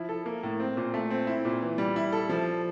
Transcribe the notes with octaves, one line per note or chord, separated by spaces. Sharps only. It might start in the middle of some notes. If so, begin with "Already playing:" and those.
Already playing: F3 E4
A4
A#3
A2
C4
A#2
A3
C4
E4
A#2
E3
G3
E4
A4
F3